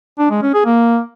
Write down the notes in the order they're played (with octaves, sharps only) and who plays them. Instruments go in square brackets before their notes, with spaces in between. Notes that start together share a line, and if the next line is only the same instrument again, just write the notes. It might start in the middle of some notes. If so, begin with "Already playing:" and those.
[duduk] D4
G#3
C#4
G#4
A#3